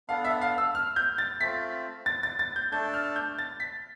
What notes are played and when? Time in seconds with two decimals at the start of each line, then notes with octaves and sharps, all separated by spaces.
0.09 B3 D4 A4 F5
0.25 E5
0.41 F5
0.58 E6
0.75 F6
0.96 G6
1.18 A6
1.40 A3 C4 F4 B6
2.06 A6
2.23 A6
2.39 A6
2.56 G6
2.72 A3 D4 A4 G6
2.94 F6
3.16 G6
3.39 A6
3.60 B6